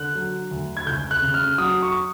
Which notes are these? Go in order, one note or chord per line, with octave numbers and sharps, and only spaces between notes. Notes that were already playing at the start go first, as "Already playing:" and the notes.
Already playing: D3 F#6
F#3
D2
G#6
C#2 G6
F#6
C#3
F6
F#3 D#6
C#6